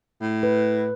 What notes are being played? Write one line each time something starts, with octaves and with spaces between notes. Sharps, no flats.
A2
B4